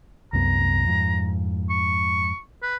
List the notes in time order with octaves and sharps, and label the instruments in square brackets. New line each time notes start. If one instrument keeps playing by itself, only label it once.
[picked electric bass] C2 F#2 B3 [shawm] A#5
[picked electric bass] F2 G#2
[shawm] C#6
B4